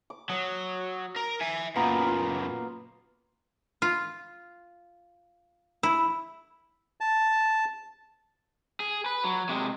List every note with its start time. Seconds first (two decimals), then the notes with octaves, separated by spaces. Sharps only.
0.10 D6
0.29 F#3 D#6
1.16 A#4
1.41 E5 G#5
1.76 F#2 A#2 A#3 B3 F4
2.07 F4
3.82 F4
5.83 E4
7.01 A5
8.80 G#4
9.06 B4
9.24 F#3
9.49 C3 G#3